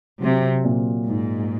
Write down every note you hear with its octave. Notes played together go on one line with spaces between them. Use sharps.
C3 F#3
A#2
G#2 D#4